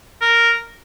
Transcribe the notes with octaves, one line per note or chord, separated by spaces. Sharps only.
A#4